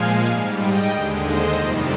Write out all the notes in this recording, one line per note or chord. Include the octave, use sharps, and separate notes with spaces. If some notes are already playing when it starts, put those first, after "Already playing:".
Already playing: A#2 F3 G#3 F5 G#5
G#2 G3
D#5 G5
D#2 D3 G#3
C5 D#5
F2 C3 D#3 G3